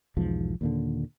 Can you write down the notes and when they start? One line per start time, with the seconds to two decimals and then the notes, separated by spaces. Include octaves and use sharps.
0.17 B1 E2 G#2 F3
0.61 D#2 A#2 D3